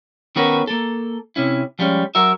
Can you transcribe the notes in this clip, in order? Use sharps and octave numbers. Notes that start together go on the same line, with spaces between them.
D#3 B3 C#4 F#4 A#4 B4
A#3 A4
C3 C#4 E4
F3 G3 G#3 C#4
F#3 F#4 A#4 E5